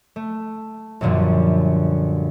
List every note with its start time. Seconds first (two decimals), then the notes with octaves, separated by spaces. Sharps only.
0.16 A3
1.01 A#1 F#2 A#2 D3 F3 G3